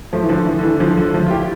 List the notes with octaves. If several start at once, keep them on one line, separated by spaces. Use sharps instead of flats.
F3 A3
E3
D3 F3
E3
D3
E3
D3 F3
D3 F3
F3 A3
F4
E4 G4